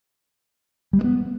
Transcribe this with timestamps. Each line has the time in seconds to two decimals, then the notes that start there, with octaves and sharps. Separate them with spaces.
0.93 G3
0.99 G#3
1.04 B3